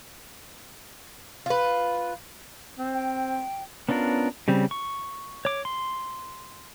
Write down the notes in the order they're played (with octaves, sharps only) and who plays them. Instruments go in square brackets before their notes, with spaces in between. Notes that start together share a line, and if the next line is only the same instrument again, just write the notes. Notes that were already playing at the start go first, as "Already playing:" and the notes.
[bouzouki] F4 B4
[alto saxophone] C4
[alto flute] G5
[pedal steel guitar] B3 C#4 D4 F4 A#4
C#3 G3 C4
C#6
C#5 D6
C6